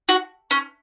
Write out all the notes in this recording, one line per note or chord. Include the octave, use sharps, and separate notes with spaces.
F#4
C#4